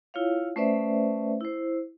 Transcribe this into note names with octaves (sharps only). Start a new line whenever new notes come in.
E4 F4 C#5 F5
A3 C#4 B4 C5 D5 E5
E4 C5